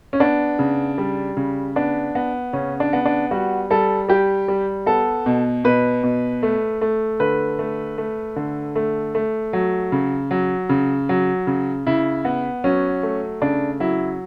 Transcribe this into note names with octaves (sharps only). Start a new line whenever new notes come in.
C#4
B3 D4
C#3
G3
C#3
B3 D4
B3
C#3 C#4
D4
B3
D4
G3 F#4
G3 A4
G3 G4
G3
B3 A4
B2
B2 B4
B2
A3
A3
D3 B4
A3
A3
D3
A3
A3
F#3
C#3
F#3
C#3
F#3
C#3
C#3 E4
B3
F#3 C#4
A3
C#3 D4
F#3 E4